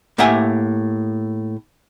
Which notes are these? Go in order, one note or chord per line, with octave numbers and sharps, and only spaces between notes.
A2 A#3 G4 E5 F#5 G#5